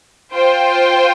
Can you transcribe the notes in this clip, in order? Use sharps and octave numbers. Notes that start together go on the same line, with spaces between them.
F4 C5 G5